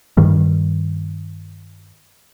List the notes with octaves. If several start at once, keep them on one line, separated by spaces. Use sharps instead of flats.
G2 D#3 G3